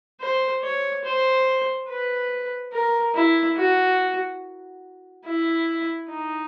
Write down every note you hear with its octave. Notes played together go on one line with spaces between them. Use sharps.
C5
C#5
C5
B4
A#4
E4
F#4
E4
D#4